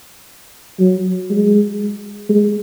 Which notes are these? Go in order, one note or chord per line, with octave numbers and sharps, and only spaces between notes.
F#3
G#3
G#3